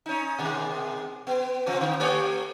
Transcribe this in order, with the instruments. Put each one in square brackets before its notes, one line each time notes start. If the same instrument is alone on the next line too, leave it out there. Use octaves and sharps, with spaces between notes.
[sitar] C#4 D#4
B2 D#3 G#3
B3
C3 F3 C4
D3
A3 G4 C#5